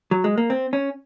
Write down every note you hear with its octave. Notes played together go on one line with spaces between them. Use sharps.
F#3
G#3
A#3
C4
C#4